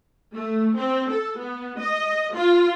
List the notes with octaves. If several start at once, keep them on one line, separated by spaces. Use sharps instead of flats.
A3
C4
A4
B3
D#5
F4